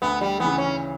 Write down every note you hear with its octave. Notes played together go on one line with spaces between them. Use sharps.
D2 B3
G3
C#3 E3 B3
C#4